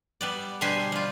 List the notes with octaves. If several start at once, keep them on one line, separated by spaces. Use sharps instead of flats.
G3 B3 D5
B2 D3 G3 G4 C5 G#5
G3 F4